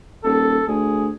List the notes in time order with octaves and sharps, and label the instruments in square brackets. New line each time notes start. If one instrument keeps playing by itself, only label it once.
[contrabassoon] D#1 [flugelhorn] A4
[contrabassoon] D2 [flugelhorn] G#4